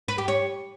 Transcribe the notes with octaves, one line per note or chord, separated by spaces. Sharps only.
B4
G4
C#5